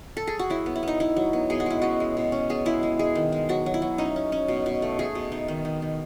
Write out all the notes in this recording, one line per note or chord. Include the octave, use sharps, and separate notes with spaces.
A4
G#4
F#4
F#3 E4
B3
E4
B3 D#4
D#4 E4
F#3
B3
B2 G#4
F#4
G#3 E4
C#4 F#4
G#3
B2
C#4
B3 G#4
G#3 E4
G#3
G#3 G#4
D#3
G#3
F#3 F#4
F#3
E4
F#3
C#4 D#4
C#4
C#4
B2
B2
A3
A3 G#4
B2
D#4
D#3
D#3
D#3